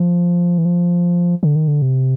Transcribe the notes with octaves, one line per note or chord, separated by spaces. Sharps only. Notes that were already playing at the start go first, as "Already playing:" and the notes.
Already playing: F3
E3
F3
D3
D#3
D3
C3